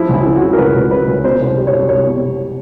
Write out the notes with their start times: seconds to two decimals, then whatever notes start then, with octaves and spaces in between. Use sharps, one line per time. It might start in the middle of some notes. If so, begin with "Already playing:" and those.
Already playing: F3 E4
0.09 C#2
0.14 E4
0.26 C#3
0.36 F#4
0.42 C#3
0.53 A#4
0.58 C#2 B4
0.74 C#2
0.91 C#3 B4
1.07 C#2
1.24 B2 C5
1.41 C2 C5
1.57 G3
1.67 C#5
1.73 C2
1.89 C2 C#5
2.06 B2